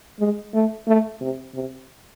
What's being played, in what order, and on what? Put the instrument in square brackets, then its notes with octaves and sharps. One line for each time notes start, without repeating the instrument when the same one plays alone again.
[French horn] G#3
A3
A3
C3
C3